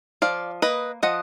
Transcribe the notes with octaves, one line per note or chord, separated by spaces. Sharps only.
F3 D5 F5
A#3 B4 D#5
F3 D#5 F#5